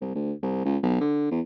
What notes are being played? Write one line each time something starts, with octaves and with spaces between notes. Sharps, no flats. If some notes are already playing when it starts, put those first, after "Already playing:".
C2
D2
C2
C#2
B1
D3
E2